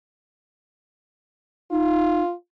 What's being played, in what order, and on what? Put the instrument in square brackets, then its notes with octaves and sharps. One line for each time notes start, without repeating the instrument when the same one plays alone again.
[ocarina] D#4 [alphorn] F4